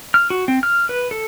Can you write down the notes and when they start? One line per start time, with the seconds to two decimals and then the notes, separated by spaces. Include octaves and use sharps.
0.14 F6
0.30 F#4
0.48 C4
0.63 F6
0.89 B4
1.11 A4